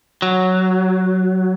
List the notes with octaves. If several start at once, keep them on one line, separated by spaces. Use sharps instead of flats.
F#3